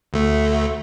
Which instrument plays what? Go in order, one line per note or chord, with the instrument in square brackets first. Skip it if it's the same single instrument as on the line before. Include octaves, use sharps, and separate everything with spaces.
[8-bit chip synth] D2 A3